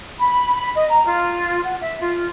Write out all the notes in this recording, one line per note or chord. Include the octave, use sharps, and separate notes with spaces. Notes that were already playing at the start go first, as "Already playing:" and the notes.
B5
B5
D#5
A#5
F4
F#5
E5
F4